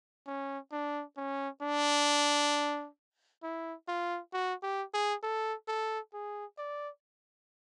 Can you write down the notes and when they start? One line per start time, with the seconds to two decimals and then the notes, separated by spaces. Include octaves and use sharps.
0.27 C#4
0.72 D4
1.17 C#4
1.62 D4
3.43 E4
3.88 F4
4.33 F#4
4.63 G4
4.94 G#4
5.23 A4
5.68 A4
6.14 G#4
6.58 D5